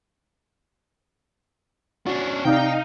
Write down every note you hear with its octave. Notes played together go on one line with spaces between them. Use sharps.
C#4 D4 F#4
C3 D#4 D5 F5 G5